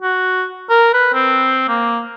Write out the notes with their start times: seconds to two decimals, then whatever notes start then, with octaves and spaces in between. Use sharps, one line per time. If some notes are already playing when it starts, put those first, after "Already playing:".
0.02 F#4
0.70 A#4
0.93 B4
1.14 C4
1.68 A#3